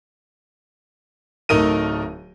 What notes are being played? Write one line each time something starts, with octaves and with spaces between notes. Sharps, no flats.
D1 A3 D#4 A#4 D#7